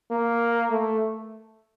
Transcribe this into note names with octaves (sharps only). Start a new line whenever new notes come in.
A#3
A3